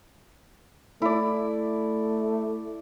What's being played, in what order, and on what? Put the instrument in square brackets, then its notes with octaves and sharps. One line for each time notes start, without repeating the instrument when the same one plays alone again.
[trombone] A3 [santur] E4 D5